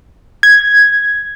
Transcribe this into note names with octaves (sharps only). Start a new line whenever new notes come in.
G#6